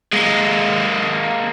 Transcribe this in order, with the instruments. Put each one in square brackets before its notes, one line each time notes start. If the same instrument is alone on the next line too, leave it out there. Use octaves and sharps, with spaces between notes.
[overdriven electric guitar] G#3 A#3